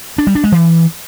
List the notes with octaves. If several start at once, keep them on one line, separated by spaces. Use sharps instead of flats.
D4
G3
D4
G#3
E3